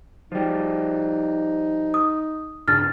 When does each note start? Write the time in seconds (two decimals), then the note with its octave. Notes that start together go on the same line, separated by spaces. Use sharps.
0.32 F3 G3 D#4
1.94 D#6
2.68 G2 C#3 D4 F6 A6